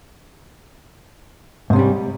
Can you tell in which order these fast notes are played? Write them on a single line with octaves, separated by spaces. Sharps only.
G#2 C3 C#4 G3